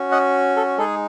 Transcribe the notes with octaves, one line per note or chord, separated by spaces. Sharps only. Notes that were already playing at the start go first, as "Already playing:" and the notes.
Already playing: C#4 F#4
D#5 F#5
A4
G#3 D#4 G#4 A4